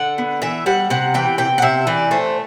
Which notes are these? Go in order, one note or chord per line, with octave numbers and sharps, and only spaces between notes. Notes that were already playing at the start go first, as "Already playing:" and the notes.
Already playing: D3 F#5
B3
E3 E5
G3 F#5
C3 F#5
E3 G5
C3 G5
F#5
C3 E5
E3 D5
A3 C5